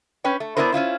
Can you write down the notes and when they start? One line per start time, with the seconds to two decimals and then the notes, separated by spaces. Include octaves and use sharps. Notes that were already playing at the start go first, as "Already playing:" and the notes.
0.24 C#4 B4 C#5 G5
0.40 A3
0.57 B3 C#4 D4 E4 A#4 C5
0.72 C#4 E4 F4 C5